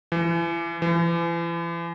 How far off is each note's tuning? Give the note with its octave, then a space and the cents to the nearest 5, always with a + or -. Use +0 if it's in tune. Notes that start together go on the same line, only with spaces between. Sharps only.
E3 +35
E3 +40